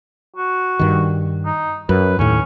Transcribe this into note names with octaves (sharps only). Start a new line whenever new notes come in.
F#4
G2 D#3
D#4
F#2 B4
D#2 A2 C#4